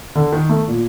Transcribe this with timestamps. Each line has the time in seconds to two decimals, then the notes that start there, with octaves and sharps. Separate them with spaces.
0.15 D3
0.32 D#3
0.49 A3
0.68 A#2